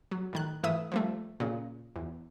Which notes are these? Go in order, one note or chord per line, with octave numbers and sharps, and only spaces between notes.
F#3
A2 D#3 F#6
G#2 E3 A3 E5 D#6 E6
F3 G3 A3
A#2 C#3
E2